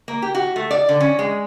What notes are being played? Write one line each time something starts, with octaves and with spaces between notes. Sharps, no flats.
A#3
G4
F#4
A3
D5
D3
C#4
G#3